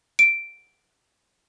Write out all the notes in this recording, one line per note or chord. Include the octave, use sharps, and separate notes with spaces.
D7